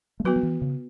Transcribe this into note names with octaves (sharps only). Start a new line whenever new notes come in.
A3
F#3 B3 F#4 B4
F#3
E3
C#3